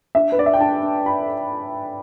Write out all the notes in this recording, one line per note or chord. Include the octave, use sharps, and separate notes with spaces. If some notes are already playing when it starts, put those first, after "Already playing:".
D4 E5
B4
D4 D5
E5
G5
D4 A5
D4
B5